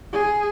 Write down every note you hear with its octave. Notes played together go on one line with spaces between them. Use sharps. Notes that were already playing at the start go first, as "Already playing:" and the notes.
G#4